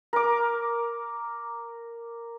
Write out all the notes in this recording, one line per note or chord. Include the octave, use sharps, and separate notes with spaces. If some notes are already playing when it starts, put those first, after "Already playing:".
A#4 D6